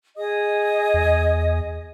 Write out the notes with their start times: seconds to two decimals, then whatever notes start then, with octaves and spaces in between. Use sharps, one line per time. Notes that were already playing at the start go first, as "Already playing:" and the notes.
0.17 G#4 D#5 D#6
0.94 E2